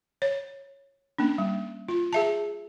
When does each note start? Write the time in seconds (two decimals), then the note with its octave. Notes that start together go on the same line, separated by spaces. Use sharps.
0.22 C#5
1.18 A#3 C#4 D4
1.38 G3
1.88 F4
2.13 G#4 E5 A5